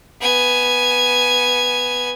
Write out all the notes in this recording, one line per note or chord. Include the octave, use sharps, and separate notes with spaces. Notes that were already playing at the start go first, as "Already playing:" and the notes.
B3 G#5